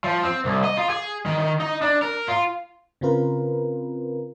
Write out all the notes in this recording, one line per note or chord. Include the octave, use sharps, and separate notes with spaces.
F3
C4
C2
D#5
F4
G#4
D#3
D#3
D#4
D4
A#4
F4
C#3 C4 F4 A#4 B4